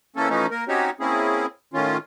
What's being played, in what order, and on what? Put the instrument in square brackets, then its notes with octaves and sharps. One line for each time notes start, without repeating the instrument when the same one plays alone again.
[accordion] E3 A#3 C#4 A4
E3 F3 A3 C#4 D#4
A#3 A#4
C4 C#4 D#4 F#4 G4 C#5
A#3 C4 C#4 E4 G#4
A2 D#3 C#4 F4